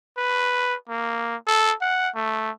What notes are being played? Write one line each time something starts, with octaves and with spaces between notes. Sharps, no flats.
B4
A#3
A4
F#5
A3